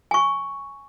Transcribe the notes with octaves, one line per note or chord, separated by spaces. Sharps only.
G#5 C#6